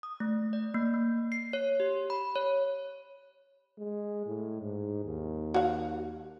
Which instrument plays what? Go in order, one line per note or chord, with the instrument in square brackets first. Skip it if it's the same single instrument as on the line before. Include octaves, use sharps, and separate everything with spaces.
[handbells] D#6
A3
D5
A#3
A#3
C7
C#5
G4
B5
C#5
[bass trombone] G#3
A2
G#2
D#2
[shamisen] F#4 F5